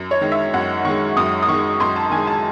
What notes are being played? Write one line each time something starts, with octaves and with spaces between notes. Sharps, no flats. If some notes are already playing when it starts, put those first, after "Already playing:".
Already playing: F#2
C#5
D#3 G#3
E5
F#2 F#5
D#3 G#3 C#6
F#2 D#6
D#6
D#3 C#6
G#3
F#2 C6
A5
D#3 G#5
G#3
A5